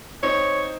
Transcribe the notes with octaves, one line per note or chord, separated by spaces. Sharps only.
C4 D#4 C#5